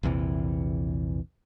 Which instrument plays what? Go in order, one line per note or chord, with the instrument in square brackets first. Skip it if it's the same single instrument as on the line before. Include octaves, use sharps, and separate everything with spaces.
[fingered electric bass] A#1 E2 C3 E3